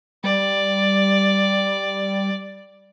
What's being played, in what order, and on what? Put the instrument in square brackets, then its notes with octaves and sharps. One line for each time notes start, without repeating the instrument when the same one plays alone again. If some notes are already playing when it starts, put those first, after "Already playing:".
[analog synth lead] G3 [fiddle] D5